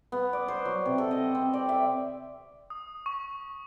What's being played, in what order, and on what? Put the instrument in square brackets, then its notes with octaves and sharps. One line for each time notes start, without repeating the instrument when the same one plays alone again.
[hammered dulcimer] B3
D5
C5
F#3
C3
A4
D#5
C4
D5
E5
[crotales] D#6
C#6